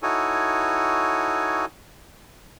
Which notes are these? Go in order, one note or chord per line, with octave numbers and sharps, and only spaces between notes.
D#4 E4 F#4 A4 C#5 G#5